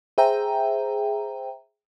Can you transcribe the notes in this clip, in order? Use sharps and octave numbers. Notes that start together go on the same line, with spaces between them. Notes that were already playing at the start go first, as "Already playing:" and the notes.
G#4 C5 E5 G5 A#5